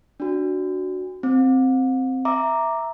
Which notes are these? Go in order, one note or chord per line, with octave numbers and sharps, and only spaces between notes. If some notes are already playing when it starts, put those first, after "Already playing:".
D4 F#4
C4
E5 A#5 D6